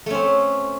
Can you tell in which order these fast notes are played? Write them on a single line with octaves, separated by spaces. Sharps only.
A3 C#4 C4